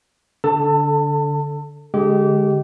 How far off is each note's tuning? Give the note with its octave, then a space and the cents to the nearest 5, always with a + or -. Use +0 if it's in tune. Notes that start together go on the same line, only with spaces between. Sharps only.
D3 -20 A4 +0 A5 +30
D3 -15 G#3 +0 G4 -25